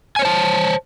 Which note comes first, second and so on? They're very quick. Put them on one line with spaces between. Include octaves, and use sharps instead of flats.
G#5 C#5 C5 A5